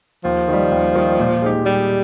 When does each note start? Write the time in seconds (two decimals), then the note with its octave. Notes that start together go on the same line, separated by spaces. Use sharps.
0.24 D#2 F3
0.48 D#3 G3
0.71 D#2
0.95 D#3 G3
1.19 A#2
1.42 G#3 D#4 G4
1.66 A#2 G3